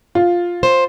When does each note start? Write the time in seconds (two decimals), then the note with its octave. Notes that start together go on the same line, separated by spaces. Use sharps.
0.15 F4
0.63 C5